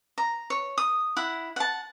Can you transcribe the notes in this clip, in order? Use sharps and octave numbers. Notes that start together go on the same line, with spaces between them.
A#5
C#5
D#6
E4 F#5
F#5 A5